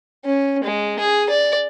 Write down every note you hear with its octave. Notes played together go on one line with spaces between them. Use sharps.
C#4
G#3
G#4
D5